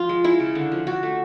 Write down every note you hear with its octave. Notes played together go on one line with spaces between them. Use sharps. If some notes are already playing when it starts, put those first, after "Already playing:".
Already playing: F3 F4
G#3
G#3 E4
C#3
D3
F3
D3 F#4
A3